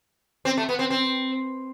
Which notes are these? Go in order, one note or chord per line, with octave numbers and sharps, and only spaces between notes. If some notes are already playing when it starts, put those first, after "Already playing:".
C4
A3
B3
C4
C4